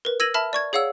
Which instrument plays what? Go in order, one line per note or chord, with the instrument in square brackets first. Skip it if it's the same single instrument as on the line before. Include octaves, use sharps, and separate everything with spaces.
[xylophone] A#4 B4
E6 G#6 A#6 D#7 F#7
E5 A5 B5 F6
D5 C#6 G#6
G#4 C#5 F5 F#5 E6